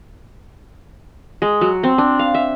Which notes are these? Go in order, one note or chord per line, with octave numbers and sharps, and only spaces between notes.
G#3
F#3
C4
D4
F5
E5